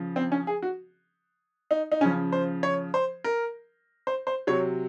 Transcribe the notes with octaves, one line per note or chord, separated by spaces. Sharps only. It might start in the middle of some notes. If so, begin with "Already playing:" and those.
Already playing: C#3 F3
C4
C#4
G#4
F#4
D#4
D#4
C#3 F3 C#4
C5
C#5
C5
A#4
C5
C5
C3 F#3 C#5